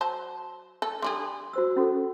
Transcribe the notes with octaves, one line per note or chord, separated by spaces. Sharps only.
F#3 C5 A5
A4
D3 G3 G#4 C6
F#4 C5 E6
C#4 F#4 A4